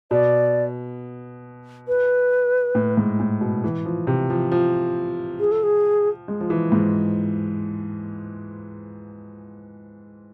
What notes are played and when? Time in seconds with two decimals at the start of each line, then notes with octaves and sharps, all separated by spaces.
0.11 B2 D5
1.88 B4
2.75 A2
2.97 G#2
3.19 A2
3.41 B2
3.64 E3
3.86 F3
4.07 C3
4.30 F3
4.52 F3
5.40 G#4
5.52 A4
5.63 G#4
6.28 G#3
6.41 F3
6.50 E3
6.72 G#2